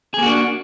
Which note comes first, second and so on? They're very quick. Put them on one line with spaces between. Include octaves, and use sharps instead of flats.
G#4 A#3 F#4 D4